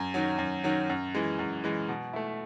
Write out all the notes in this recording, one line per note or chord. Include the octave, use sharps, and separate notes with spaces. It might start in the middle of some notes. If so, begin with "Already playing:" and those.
Already playing: F#2
D#3 F#3
F#2
D#3 F#3
F#2
E3 G#3
F#2
E3 G#3
B2
A3 E4